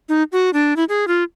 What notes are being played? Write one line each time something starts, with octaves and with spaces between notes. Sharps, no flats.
D#4
F#4
D4
E4
G#4
F4